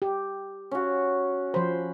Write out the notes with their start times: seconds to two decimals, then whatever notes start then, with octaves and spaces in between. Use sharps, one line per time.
0.02 G4
0.71 C#4 F#4
1.54 F3 C5 B5